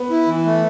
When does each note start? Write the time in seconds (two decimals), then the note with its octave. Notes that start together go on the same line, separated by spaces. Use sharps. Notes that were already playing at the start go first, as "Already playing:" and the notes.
Already playing: B3
0.10 E4
0.27 E3
0.45 A3